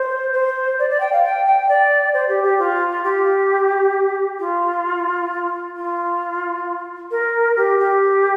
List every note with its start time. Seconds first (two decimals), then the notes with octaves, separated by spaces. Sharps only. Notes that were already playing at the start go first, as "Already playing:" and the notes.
Already playing: C5
0.33 C5
0.79 D5
0.90 D5
1.00 G5
1.12 F5
1.24 G5
1.46 G5
1.69 D5
2.13 C5
2.28 G4
2.43 G4
2.59 F4
3.04 G4
4.39 F4
5.76 F4
7.11 A#4
7.56 G4
7.79 G4